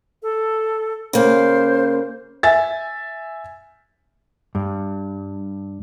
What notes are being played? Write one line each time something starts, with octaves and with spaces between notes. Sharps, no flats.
A4
C#3 A#3 C5
E5 G#5 A6
G2